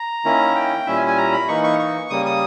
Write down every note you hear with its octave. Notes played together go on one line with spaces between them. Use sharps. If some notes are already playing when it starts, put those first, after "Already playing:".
Already playing: A#5
D#3 A#3 C#4 E4
G5
A#2 G3 C#4 E4 E5
G#5
G#5
A#5
B5
E3 A#3 D#4 C#6
C#6
C#6
C#3 G3 A#3 D#6
D#6